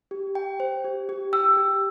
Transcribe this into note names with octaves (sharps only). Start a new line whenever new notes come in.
G4
G5
C5
G4
G4
G5 E6
G4